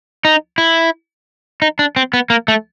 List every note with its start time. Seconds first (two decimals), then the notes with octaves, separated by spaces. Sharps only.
0.25 D#4
0.58 E4
1.62 D#4
1.79 D4
1.96 C4
2.14 B3
2.30 A#3
2.48 A3